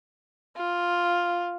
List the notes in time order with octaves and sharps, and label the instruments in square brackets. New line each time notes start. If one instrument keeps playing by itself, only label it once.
[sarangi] F4